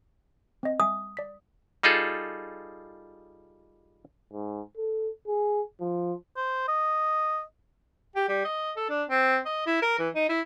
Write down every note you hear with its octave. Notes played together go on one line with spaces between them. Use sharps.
C4 D#5
E5 G#5 D#6
D5 B6
G3 D#4 F4 G#4 A4
G#2
A4
G#4
F3
C5
D#5
G4
G3
D#5
A4
D4
C4
D#5
E4
A#4
E3
D#4
E4